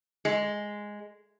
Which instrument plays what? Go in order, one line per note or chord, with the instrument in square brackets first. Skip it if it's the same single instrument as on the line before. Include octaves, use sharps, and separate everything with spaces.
[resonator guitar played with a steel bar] G#3